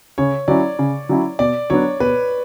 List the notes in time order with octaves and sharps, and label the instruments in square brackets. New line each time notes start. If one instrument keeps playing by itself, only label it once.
[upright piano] C#3 [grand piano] C#5
[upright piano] F#3 C#4 E4 [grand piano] D5
[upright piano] C#3
F#3 C#4 E4
[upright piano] B2 [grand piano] D5
[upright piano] F#3 B3 D4 [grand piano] C#5
[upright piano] B2 [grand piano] B4